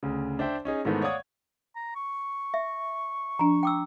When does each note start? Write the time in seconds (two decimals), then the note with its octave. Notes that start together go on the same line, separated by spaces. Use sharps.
0.03 D2 C#3
0.39 D4 C5 E5 G5
0.65 C#4 D#4 G#4
0.85 G#2 D#3 E3 A3 B3 C5
1.02 C#5 D5 F5 F#5 D#6 G#6
1.76 A#5
1.96 C#6
2.54 E5
3.39 F3 D4 A#5
3.63 G5 D6 E6